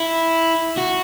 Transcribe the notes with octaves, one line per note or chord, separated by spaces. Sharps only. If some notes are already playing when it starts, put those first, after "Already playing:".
Already playing: E4
F#4